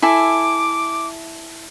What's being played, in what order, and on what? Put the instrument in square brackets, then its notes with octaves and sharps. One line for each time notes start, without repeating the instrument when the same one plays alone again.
[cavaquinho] E4 A4 G#5 [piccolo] D6